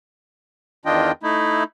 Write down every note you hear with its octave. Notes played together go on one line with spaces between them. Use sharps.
E2 D#3 D4 F4 D#5 G5
A3 D#4 E4